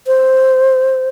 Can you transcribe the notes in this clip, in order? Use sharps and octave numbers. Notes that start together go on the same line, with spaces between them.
C5